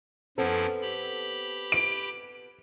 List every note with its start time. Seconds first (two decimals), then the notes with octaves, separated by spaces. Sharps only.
0.38 F#2 F3 B3 C4 E4 A4
0.82 G4 B5
1.72 D7